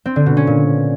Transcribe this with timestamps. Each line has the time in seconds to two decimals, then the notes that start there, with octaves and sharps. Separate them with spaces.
0.06 C4
0.16 D3
0.26 B2
0.37 C#4
0.47 A#2